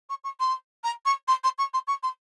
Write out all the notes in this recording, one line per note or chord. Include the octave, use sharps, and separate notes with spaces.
C#6
C#6
C6
A#5
C#6
C6
C6
C#6
C6
C#6
C6